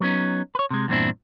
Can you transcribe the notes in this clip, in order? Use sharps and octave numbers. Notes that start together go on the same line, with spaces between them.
F#3 G3 B3 C#4 D#4
B4 C#5
C3 G#3
E2 G2 A#2 C4 D4 E4